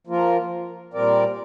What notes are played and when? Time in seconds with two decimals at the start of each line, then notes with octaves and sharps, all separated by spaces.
0.07 F3 A#3 F4 A#4
0.94 A#2 G3 C4 A#4 D5